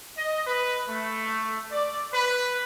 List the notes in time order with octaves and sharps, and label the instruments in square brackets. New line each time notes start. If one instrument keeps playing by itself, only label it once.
[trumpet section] D#5
B4
A3
D5
B4